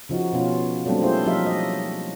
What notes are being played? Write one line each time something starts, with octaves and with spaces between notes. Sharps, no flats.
C#3 F3 D#4 F#4
B2 B3 C#4 F4
F#3 G3 A3 A#3 C4 D4
A#3 D4 E4 F4 G#4 C5
F3 F#3 D#4 G4 E5 F5
D#5